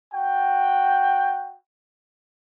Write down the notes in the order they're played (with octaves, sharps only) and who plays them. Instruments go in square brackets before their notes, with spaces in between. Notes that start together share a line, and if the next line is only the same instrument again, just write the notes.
[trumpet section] F#4 G5